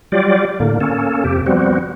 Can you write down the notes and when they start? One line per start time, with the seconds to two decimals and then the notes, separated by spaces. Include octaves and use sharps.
0.12 F#3 G3 F4 G4 D5
0.60 A2 D3 A#3
0.81 A#3 C#4 A4
1.24 F2 C3 G4
1.46 F3 G3 B3 C4 F#4